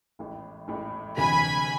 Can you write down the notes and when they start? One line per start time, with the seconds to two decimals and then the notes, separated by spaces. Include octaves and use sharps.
0.19 A1 A2 G#3
0.68 A1 A2 G#3
1.17 D2 C3 E3 G#3 G#5 B5